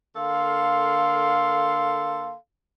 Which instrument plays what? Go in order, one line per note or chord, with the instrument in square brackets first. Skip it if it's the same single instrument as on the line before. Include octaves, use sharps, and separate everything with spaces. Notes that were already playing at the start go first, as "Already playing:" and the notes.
[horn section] D3 A#3 A4 F5 C6